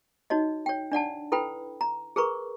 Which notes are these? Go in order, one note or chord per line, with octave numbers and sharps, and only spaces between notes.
D#4 F#4 C#5 D#5
C#5 G5
D4 D5 F#5 A5
E4 A4 B4 G5 B5
A#5
G#4 A#4 B4 A#5 C#6